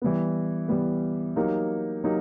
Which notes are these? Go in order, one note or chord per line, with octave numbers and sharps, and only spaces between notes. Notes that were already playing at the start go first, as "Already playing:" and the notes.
E3 G3 B3
E3 G3 B3
F#3 A#3 D#4 G4
F#3 A#3 D#4 G4